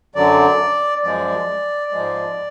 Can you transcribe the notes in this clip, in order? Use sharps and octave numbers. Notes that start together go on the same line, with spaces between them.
F#2 D3 F#3 D5
F#2 F3 G#3 D5
G#2 F3 G#3